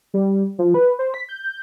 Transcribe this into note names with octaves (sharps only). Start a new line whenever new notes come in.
G3
F3
B4
C5
B6
G6